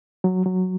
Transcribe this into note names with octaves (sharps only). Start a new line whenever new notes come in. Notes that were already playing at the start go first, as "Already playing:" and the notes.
F#3
F#3